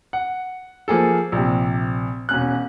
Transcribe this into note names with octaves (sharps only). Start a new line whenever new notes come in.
F#5
F3 A#3 G#4 A4
A#1 C3
E1 C#4 F#6